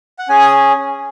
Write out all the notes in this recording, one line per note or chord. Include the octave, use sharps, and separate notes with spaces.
F#5
C#4 G#4 G#5
D#6